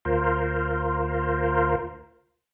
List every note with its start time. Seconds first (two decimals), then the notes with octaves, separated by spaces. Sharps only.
0.05 D2 F4 A#4 C5